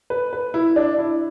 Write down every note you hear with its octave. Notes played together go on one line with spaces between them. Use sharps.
B4
B4
E4
D4
E4